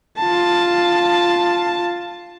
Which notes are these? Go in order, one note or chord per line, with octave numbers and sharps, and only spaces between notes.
F4 A5